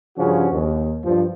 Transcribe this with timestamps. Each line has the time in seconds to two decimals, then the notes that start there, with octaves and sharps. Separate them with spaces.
0.18 G2 C#3 F3 C#4 F#4
0.52 D#2
1.04 G2 F3